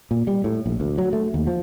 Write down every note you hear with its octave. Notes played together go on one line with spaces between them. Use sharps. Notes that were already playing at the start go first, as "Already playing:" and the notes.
A#2
G3
A2
A#1
D2
F#3
A3
D#2
F3